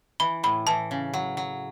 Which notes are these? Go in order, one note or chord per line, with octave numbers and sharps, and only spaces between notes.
E3 B5
A2 B5
E3 A5
C#3
F#3
F#3